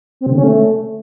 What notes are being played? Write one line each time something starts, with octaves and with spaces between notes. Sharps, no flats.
C4
C3
D3
C#4
A3